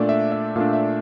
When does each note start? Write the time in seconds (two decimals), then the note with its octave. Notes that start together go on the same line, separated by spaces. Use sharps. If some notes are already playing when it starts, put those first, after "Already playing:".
Already playing: A#2 A3 D4 D5
0.09 E5
0.32 E5
0.56 A#2 A3 D4 F5
0.73 E5